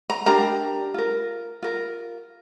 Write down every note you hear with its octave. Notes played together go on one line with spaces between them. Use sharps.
A#5
D4 G4 A#4 A#5
F4 A#4
F4 A#4